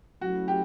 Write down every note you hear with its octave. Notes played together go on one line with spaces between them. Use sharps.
F#3 A3 C#4 E4 F#4
G4